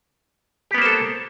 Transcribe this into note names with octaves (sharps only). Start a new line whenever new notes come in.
A#3 B3 G4 A4 C5